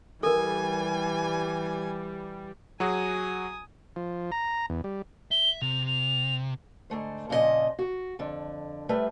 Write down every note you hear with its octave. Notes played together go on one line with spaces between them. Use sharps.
E3 G3 A4 A#4 G#5
F#3 F#4 G#4 G#5 D#6
F3
A#5
E2
G3
E5 G7
C3 F7
F7
G#2 D3 A3 C5
F2 A#2 C#3 F3 F4 D#5
F#4
F2 D3
G3 A3 B4 C5 E5